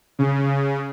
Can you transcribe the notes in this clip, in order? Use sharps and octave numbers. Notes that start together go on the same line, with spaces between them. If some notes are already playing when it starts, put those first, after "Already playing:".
C#3